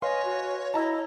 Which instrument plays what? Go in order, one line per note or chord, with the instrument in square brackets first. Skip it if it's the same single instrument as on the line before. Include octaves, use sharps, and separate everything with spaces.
[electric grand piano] B4 F5 C6 [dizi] C#5 [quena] D#5 [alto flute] G#5
[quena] F#4
[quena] E4 [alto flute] D#5 [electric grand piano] A5 A#5 E6